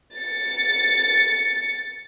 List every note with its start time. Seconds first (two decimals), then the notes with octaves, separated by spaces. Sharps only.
0.16 A6 C#7